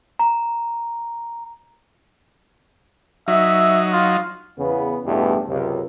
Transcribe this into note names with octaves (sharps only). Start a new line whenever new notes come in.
A#5
F#3 D#4 E5
F4
E2 C#3 B3
A1 E2 G2 B2 A3 G4
C#2 F#2 C3